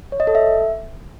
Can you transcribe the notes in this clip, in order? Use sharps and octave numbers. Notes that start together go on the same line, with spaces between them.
C#5
D#5
A4
E5